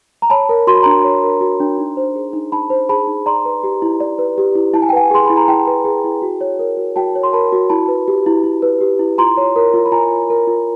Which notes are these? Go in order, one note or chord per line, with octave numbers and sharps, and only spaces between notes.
A#5
C#5 A5 B5
A#4
F#4 C6
B5
D4 A#5 C6
C#5
A#4
F#4
D4
D#4
C5
G#4
D#4
D#4 A5 B5
C5
G#4 A5 B5
D#4
D5 A#5 C6
B4
G4
E4
D5
B4
G4
E4
E4 A5
G#5
G5
B4 F#5 G#5
G#4 C6
E4 B5
A#5
E4 G5 A5
B4
G#4
E4
F#4
C#5
A#4
F#4
F#4 G5 A5
C#5
C6
A#4 A5 B5
F#4
E4 A5 B5
B4
G4
E4
E4
B4
G4
E4
F4 A#5 C6
C#5
A#4
F4
B5
F4 G#5 A#5
C#5
A#4
F4